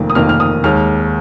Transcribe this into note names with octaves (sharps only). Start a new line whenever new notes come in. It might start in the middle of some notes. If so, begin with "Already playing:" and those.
Already playing: F1 F2 D#3 A#3
D#6
F1 F2 D#3 A#3 F6
F6
D#6
D#2 D#3 G#3 F6